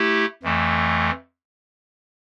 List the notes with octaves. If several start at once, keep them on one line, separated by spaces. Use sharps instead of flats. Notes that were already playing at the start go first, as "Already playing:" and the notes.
Already playing: A3 E4 G4
F2 E3 A3